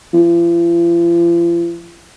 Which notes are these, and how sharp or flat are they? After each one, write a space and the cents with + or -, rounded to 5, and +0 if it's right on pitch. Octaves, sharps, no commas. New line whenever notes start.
F3 -45